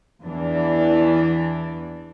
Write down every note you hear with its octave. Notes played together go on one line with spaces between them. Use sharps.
E2 E3 D4